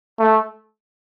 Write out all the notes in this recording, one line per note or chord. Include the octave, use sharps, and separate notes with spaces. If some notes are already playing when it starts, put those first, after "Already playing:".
A3